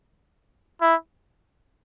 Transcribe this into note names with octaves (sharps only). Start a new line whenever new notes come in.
E4